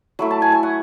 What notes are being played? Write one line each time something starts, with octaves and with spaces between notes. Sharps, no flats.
F#3 A3 E4 B5
A5
G#5
G#5
F#5